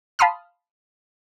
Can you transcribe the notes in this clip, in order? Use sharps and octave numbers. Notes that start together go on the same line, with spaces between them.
F5 A5 B5 C6 D#6 F6